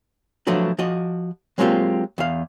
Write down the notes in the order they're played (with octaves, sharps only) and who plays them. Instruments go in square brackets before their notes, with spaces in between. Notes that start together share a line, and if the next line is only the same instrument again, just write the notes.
[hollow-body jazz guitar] F3 F#3 A3 D4 F#4 B4
F3 F#4 D#5
F#3 G#3 A#3 C4 F4 G4
E2 F5